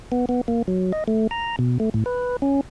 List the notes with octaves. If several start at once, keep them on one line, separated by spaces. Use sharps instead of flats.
B3
B3
A#3
F#3
D#5
A3
A#5
B2
A3
A2
B4
C#4